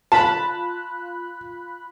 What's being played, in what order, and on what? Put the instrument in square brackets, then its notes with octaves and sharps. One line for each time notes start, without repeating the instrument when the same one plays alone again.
[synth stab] F4 B5 F#6 [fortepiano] A5